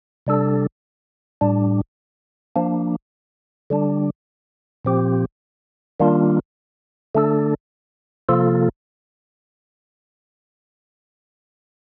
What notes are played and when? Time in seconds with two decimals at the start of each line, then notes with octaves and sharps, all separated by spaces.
0.27 C3 G3 D4 A4
1.41 A2 G3 D4
2.56 F3 A#3 D4
3.70 D3 G3 D4
4.85 A#2 F3 C4 G4
6.00 D#3 G3 A#3 D4 F4
7.15 D3 A3 D4 A4
8.29 C3 F3 A#3 F4 A4